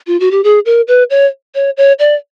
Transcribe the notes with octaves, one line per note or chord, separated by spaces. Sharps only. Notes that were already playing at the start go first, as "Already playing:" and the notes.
F4
F#4
G4
G#4
A#4
B4
C#5
C#5
C#5
D5